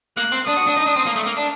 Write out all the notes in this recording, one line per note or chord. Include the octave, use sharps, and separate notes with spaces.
A#3 F#6
C4
D4 D#6
F#4
D4
D#4
D4
C4
A#3
A3
A#3
D4